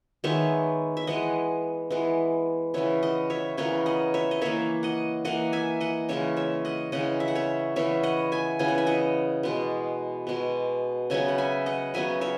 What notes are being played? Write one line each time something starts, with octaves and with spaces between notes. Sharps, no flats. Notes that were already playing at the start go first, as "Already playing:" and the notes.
D#3 G#3 B3 C#5 E5
E5
E3 G#3 B3 D#5 F#5
E3 G#3 B3
C#3 E3 B3 C#5 E5
D#5 F#5
C#5 E5
C#3 E3 B3 A#4 C#5
D#5 F#5
C#5 E5
D#5
E3 A#3 C#5 E5
D#5 F#5
E3 A#3 D#5 F#5
E5 G#5
D#5 F#5
C#3 E3 G#3 C#5 E5
C#5 E5
D#5 F#5
C#3 E3 G#3 D#5 F#5
E5
F#5
C#5 E5
C#3 E3 B3 C#5 E5
D#5 F#5
E5 G#5
C#3 E3 B3 G#5
F#5
E5
D#5 F#5
B2 G#3 B3
B2 G#3 B3
C#3 F#3 B3 E5 G#5
F#5
E5 G#5
D#5 F#5
C#3 F#3 B3 E5 G#5
C#5 E5